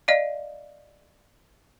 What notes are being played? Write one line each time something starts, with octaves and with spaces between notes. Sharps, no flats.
D5 D#5 F5